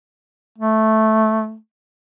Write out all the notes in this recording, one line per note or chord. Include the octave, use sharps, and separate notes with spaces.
A3